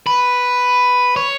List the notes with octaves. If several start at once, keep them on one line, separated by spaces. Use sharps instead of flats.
B4
C#5